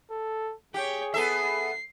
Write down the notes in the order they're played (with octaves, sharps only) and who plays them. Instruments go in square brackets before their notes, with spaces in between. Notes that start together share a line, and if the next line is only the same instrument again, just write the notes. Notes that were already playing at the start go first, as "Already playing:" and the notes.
[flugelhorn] A4
[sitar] G4 [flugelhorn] G#4 [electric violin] C#5 G5
[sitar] B3 A4 E5 [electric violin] C7